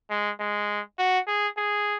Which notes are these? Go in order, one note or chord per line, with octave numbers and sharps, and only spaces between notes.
G#3
G#3
F#4
G#4
G#4